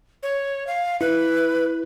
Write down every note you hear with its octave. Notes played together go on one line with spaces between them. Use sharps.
C#5
F5
E4 B4